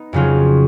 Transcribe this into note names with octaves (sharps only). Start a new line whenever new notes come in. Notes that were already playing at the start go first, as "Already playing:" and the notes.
Already playing: B3 D#4
F2 C#3 F#3 C#4 F4